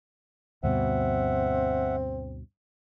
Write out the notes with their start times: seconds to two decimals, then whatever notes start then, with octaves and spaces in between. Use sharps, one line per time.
0.63 D2 G2 B2 C4 E5 F#5